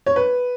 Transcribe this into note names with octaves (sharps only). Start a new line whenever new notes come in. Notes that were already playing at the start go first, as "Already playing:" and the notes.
C#5
B4